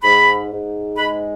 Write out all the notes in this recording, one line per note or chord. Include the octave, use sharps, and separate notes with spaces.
G#2 B5
G#2
G#3 B5